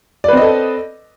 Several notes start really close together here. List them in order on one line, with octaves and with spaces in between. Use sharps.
D5 B4 C4 D#5 A4